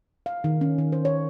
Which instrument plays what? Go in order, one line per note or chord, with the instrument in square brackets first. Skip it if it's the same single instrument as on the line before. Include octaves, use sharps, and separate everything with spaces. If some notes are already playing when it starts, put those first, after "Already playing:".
[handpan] F5
D#3
C#4
D#3
C5
C#5